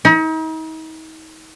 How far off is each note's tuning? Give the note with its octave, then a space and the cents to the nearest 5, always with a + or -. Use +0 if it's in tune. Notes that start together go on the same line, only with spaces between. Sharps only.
D#4 +40